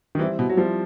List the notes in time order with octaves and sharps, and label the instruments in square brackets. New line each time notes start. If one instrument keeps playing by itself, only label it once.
[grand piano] D#3
[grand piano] E3 [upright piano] G3 C4 E4
[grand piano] B2
F#3
[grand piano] F3 [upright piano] G3 C4 E4